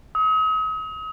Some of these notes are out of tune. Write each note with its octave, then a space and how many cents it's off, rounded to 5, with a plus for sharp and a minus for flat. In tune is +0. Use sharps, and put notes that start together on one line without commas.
D#6 +40